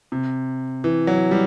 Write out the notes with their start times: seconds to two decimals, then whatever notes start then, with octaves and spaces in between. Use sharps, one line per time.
0.12 C3
0.84 E3
1.07 F#3
1.31 G3